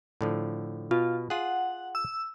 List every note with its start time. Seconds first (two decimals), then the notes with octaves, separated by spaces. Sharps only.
0.21 A2 D3 F3
0.91 B2 F4
1.30 F4 G#4 F#5
1.95 E6